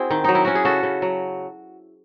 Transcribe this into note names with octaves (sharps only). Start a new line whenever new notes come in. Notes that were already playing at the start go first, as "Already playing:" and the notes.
Already playing: C4 E4 F#4 G#4
D#3
F#3 D#4
E4
C#4 F#4
G#4
C#3 F#4 A4
C#3
F#3